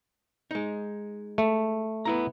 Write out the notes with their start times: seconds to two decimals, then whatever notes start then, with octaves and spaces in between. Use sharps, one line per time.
0.51 G#3 D#4
1.38 A3
2.05 B3 E4 A#5